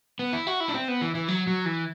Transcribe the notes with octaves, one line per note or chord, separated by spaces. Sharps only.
B3
E4
F#4
E4
D4
C4
B3
E3
E3
F#3
F#3
E3